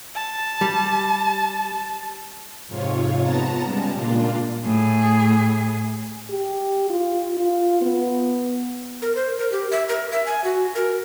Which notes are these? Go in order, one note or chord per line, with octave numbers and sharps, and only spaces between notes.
A5
G3
F2 G#2 C3 F4 C#5
B3 A5 A#5 A6
C#3 G3 G#3 A5
A#2 A#3 D4 F4
A2 G#4
G4
F4
F4
B3
A#4
C5
A#4
G4
E5
A#4
E5
G#5
F#4
A#4